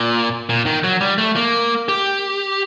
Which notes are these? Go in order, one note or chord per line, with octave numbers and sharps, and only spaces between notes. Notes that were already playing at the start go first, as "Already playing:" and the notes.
Already playing: A#2
A#2
D#3
F#3
G3
A3
A#3
G4